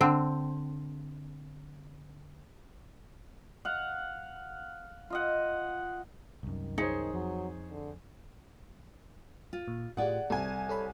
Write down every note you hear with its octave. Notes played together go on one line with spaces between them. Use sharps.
D3 C4
F5 F#5
F4 D#5 F#5
C2 F#2 D#3
D#4 G#4 C5 C#5
F2 F#3
D3
F4
A#2
A2 F4 G4 G#4 D5 F#5
C2 A4 G#5
A4 C#5 B5